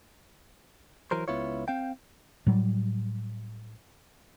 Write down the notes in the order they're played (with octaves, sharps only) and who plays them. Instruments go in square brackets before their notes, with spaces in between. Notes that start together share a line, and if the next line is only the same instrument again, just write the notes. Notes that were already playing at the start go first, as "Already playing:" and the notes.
[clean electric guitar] E3 F#3 A#4 C5
C#2 B3 E4 F4 C#5
C4 F5 G5
[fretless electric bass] A2 F#3 G3